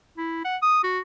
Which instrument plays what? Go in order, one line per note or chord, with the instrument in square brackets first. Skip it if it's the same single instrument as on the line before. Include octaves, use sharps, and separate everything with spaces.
[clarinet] E4
F#5
D#6
F#4